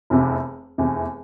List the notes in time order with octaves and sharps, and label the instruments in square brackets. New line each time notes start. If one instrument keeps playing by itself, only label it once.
[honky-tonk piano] F1 E2 C3
F1 E2 C3